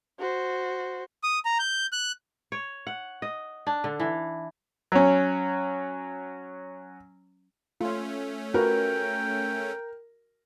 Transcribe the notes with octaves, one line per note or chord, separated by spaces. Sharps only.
F#4 C5
D#6
A#5
G6
F#6
C#5
F#5
D#5
D4
D3
E3
F#3 C#4
A3 C#4 F4
F4 F#4 A#4 B4 G5